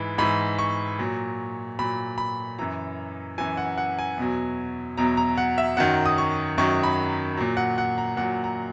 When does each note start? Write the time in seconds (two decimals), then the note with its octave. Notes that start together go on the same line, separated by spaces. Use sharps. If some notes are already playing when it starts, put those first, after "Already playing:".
Already playing: G#2 E3 B5
0.18 G#2 E3 B5
0.58 C#6
0.99 A#2 F#3
1.79 A#2 F#3 B5
2.18 B5
2.59 F#2 E3 A#5
3.38 F#2 E3 G#5
3.57 F#5
3.78 F#5
3.99 G#5
4.18 E2 B2 F#3
4.97 E2 B2 F#3 A#5
5.17 A#5
5.38 F#5
5.58 E5
5.77 F#2 D#3 F#3 F#5
6.06 D#6
6.18 C#6
6.58 F#2 D#3 F#3 C#6
6.83 B5
7.37 A#2 F#3
7.57 F#5
7.78 F#5
7.98 A#5
8.17 A#2 F#3 F#5
8.44 A#5